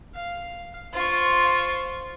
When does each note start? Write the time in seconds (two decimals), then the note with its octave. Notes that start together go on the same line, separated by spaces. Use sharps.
0.14 F5
0.93 F4 C5 C#6